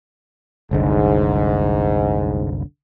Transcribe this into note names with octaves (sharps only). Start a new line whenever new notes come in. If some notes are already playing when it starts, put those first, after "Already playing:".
F#1 C2 G#2 D3